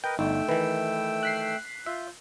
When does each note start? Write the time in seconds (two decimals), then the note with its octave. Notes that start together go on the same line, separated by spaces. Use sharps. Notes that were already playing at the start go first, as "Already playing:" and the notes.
0.04 A#4 B4 D#5 G5
0.19 G1 A3 D#4 G5 E6
0.49 D#3 E3 B4
1.23 F#6 B6 C7
1.86 F4 E5 G6